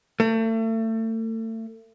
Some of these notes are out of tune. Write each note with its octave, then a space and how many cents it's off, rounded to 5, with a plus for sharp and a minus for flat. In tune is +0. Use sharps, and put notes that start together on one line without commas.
A3 +35